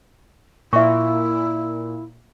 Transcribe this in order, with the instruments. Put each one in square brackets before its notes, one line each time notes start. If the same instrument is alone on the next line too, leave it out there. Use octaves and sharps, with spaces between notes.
[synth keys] A#2 [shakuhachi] E4 [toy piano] E5 C#6